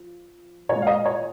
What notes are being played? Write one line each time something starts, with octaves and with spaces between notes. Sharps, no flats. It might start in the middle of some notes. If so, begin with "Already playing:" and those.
Already playing: F3
A#2 G#3 C#5
F5
D#5
C#5